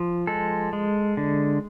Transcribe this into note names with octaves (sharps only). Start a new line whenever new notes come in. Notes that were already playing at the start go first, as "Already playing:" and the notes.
Already playing: F3
G#3 A4
G#3
D3